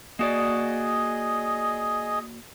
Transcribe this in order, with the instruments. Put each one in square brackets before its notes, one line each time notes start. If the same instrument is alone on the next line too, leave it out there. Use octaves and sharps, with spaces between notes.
[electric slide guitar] A#3 F#4 D5 [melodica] G#4 D#5